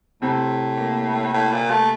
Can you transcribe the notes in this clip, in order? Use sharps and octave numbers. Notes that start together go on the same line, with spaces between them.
A2 C3 C4
A#3
A2
A#2
A3